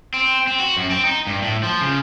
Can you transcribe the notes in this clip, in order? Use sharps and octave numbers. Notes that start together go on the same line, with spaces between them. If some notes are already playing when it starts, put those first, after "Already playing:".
C4
C4
F#4
F#2
C4
D#4
G2
A2
F3
C#3